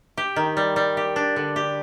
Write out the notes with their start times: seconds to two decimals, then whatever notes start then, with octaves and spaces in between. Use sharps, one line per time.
0.17 G4
0.36 D#3
0.57 G3
0.76 G3
0.97 G4
1.16 D4
1.36 D3
1.56 G4